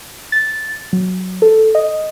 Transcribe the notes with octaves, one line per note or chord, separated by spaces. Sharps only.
A6
F#3
A4
D#5